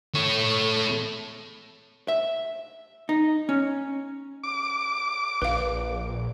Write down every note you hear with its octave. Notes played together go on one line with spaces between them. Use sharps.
A3 C#5
E5
D#4
C#4
D6
A#1 B4 F5